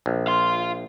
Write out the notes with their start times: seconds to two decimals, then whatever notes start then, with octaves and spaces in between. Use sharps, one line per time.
0.06 A#1
0.27 F5 C6